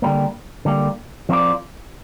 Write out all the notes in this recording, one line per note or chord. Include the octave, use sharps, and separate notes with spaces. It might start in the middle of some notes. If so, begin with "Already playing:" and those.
D3 G3 A#3
D3 G3 A#3
F3 C4 F4 A#4 D5